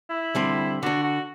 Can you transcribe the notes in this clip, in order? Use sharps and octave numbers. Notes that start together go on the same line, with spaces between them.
E4
D3 G3 C4
D3 D4 F#4
F#4